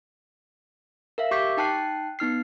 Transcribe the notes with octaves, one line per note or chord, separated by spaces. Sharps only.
A#4 E5 F5
G4 C#6 D6 G6 B6
D#4 G5 A5 F#6 C7
B3 D#4 F6 C7